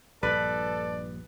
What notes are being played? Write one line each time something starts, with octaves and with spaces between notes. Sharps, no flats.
A#1 G2 A4 B4 D5